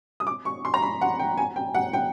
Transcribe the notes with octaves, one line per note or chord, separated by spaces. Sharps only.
D#6
D6
C#6
C6
A#5
B5
F#5
G5
G#5
G5
F#5
G5